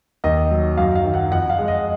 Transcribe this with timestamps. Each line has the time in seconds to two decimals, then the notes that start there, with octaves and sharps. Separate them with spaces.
0.24 D#2 D#5
0.51 F#3
0.77 F#2 F5
0.95 F5
1.04 D#3
1.14 F#5
1.31 F2 F#5
1.50 F5
1.59 G#3
1.68 D#5